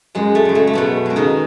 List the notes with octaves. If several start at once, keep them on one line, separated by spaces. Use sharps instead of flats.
F#2 G#3
A3
C#3 G#3
A3
A3
F#2 B2 B3
C#3 G#3
D#3 D#4